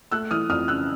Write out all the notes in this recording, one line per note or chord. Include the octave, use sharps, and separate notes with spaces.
A3 E6 F#6
E3 D#6 F6
F2 D#6 F6
C#3 E6 F#6